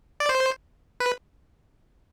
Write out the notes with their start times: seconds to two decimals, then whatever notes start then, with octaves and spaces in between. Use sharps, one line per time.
0.20 D5
0.29 C5
1.00 B4